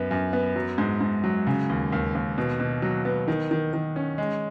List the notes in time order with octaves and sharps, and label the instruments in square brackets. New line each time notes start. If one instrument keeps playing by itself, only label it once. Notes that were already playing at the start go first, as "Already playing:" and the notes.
Already playing: [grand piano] F#2 B3
F#2
B3
F#3
G#2
G#2
F#3
C#3
D#2
D#2
D#2
B2
B2
F#3
B3
D#3
D#3
D#3
C#4
G#3